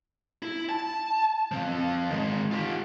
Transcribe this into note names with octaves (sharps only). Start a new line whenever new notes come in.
E4
A5
F3 C4
D#3 G#3
F4 G4